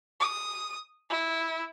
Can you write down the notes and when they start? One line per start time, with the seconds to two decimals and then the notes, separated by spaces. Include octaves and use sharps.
0.20 D#6
1.10 E4